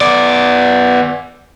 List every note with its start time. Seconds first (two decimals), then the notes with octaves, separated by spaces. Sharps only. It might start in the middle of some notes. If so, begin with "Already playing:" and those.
0.01 B3 D5